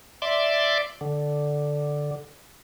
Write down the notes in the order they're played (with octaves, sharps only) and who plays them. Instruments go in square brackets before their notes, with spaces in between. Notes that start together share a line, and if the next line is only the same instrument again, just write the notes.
[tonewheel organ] D5 E5 C6 D6
D3